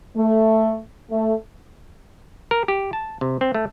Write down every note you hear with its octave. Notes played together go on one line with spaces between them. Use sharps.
A3
A3
A#4
G4
A5
C3
C4
A3